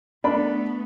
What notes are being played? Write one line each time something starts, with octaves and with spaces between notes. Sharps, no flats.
A3 B3 D4 B5